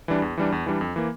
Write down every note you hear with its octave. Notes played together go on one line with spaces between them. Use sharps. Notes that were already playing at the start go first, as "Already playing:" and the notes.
E3 G3 D4
E2
E3 G3 D4
E2
E3 G3 D4
F2
E3 A#3